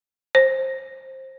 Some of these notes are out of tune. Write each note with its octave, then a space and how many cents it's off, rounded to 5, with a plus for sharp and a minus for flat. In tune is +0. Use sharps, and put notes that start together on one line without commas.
C5 +20